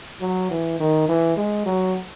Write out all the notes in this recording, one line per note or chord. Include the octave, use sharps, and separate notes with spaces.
F#3
E3
D#3
E3
G#3
F#3